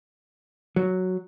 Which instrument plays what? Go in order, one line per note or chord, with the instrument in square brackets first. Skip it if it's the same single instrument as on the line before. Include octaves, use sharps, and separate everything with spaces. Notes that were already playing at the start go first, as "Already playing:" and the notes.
[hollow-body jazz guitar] F#3